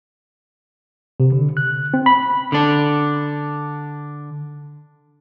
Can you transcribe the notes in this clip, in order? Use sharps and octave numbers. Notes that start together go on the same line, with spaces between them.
C3
D3
F#6
C4
B5
D3 D4